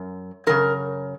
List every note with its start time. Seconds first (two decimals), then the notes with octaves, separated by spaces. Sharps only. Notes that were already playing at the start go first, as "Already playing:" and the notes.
Already playing: F#2
0.47 F#2 C#3 A#4